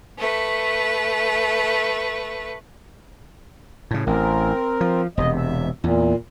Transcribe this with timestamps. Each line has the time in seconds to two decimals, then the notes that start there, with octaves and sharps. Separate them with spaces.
0.18 A3 B4
3.91 A2 C#3
4.07 A1 C4 A#4
4.81 F3
5.17 E1 C3 D#5
5.37 E5
5.84 E2 A#2